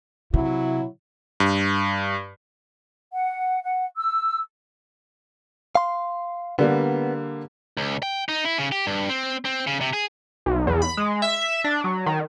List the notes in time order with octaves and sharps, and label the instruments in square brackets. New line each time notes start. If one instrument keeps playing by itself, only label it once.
[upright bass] C3 [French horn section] F#3 E4
[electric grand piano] G2
[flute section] F#5
F#5
E6
[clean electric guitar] F5 C6
[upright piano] D3 G3 A#3 [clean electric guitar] B3
[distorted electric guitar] C#2
G5
D#4
E4
C#3
G4
G2
C4
C4
C#3
C3
G#4
[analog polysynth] B1
E2
B5
G#3
E5
D4
F#3
D#3